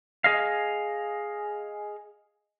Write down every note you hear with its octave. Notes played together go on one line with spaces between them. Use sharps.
G#4 D#5 F5